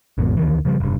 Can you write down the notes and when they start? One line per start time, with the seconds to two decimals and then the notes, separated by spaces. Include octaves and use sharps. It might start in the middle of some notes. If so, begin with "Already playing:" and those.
0.18 G#1 E2 G#2 B2
0.37 D2 D#3 E3
0.65 C#3 F3 G3
0.80 F1 G2